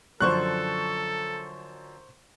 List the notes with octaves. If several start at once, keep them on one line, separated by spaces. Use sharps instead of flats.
F#2 D3 F3 A4 C5 C#6 F#6